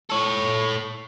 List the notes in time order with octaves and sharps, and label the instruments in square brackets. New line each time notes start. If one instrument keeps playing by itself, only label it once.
[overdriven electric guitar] A4 C#5